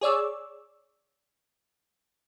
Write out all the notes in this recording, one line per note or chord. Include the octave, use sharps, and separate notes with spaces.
G#4 C#5 D5 E6